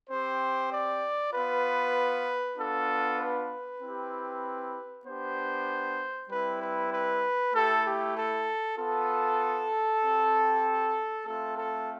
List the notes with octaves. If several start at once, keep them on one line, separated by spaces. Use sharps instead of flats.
C4 G4 C5
D5
B3 F4 B4
B3 D4 F4 A4
B4
C4 E4 G4
B3 D4 G4 C5
G3 C4 E4 B4
B4
B4
A3 E4 G4 A4
G4
A4
B3 F4 A4
C4 G4
A3 C4 F4 A4
A4